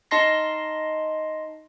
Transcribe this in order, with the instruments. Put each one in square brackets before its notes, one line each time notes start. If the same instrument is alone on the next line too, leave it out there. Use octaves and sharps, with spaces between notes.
[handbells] D#4 D#5 A5 C6 A#6 C7